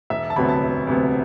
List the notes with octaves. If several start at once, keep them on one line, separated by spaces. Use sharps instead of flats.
E1 E5
A5
D2 C3 F#3 B3 B5
A5
E1
D2 C3 F#3 B3